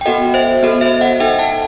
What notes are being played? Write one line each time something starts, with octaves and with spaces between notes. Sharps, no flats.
G5
B3 F#4 A4 D#5 F#5
C5 E5
B3 F#4 A4 D#5
C5 E5
D#5 F#5
D#4 A4 E5 G5
F#5 A5